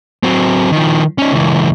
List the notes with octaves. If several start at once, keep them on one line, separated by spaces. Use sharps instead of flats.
F#3 C4
D#3 F3
C#4 D#4
C#2 E3